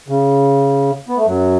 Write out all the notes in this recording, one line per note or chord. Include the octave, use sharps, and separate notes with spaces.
C#3
B3
A3
F#2 F#3